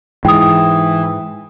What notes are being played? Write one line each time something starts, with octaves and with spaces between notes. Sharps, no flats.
G#2 E3 G5 D#6